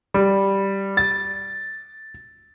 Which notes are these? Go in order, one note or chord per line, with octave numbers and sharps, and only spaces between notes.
G3
A6